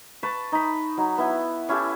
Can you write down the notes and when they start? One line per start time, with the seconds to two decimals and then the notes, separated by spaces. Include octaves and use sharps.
0.23 B4 A5 C#6
0.52 D#4 B5
0.97 F#3 D#4
1.18 B3 E4
1.69 C#4 E4 G4 A4